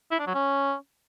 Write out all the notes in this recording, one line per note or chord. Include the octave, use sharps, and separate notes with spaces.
E4
D4
F#3
C#4